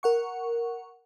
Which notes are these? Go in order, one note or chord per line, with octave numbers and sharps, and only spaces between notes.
A#4 F#5 C#6